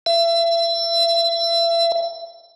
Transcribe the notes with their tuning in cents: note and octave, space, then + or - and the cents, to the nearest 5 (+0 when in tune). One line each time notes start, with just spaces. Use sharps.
E5 +35